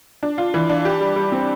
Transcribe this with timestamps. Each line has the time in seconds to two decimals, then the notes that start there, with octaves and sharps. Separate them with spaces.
0.23 D4
0.38 F4
0.54 E3
0.69 D4
0.85 G4
1.01 G3
1.16 G3
1.32 C4